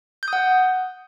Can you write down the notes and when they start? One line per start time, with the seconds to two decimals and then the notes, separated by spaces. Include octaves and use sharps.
0.23 G6
0.28 D#6
0.33 F#5